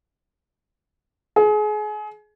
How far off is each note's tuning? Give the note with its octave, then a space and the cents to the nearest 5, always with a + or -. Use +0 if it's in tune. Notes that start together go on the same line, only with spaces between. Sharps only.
G#4 +30